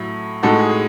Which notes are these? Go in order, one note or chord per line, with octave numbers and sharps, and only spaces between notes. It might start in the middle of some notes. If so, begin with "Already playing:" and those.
Already playing: A2 F#3 E4
A2 G#3 D#4 F#4 A4
G#4
G#4